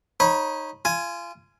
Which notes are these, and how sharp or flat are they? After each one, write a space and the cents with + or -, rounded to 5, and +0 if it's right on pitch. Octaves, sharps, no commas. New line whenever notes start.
D#4 +0 C#5 -30 B5 -20
F4 -25 G#5 +5